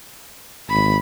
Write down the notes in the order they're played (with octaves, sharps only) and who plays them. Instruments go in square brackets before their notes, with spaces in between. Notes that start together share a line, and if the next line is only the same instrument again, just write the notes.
[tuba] G#1 [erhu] B5